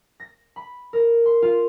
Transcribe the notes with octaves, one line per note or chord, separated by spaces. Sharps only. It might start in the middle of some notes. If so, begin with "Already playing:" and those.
A#6
B5
A#4
C6
F4